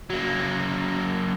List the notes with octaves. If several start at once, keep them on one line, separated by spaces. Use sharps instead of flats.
F#3 A#3